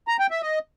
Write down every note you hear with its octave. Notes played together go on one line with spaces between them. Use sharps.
A#5
G5
E5
D#5